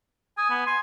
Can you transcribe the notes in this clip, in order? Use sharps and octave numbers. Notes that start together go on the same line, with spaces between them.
G#5 D#6
B3
G#5 C6